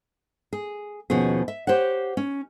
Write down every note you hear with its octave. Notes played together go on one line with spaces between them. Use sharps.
G#4
D#2 B2 F3 C#4 G#4
E5
G4 C5 C#5 F#5
C#4